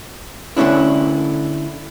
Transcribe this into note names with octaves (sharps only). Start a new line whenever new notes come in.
D3 A3 C#4 D4 E4